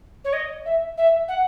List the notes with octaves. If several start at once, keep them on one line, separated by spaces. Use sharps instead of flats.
C#5
D#5
E5
E5
F#5